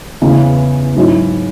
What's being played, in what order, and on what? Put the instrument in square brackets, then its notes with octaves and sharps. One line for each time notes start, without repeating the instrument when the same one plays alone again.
[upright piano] E2 C#3 E3 B3
G#2 F#3 C#4 E4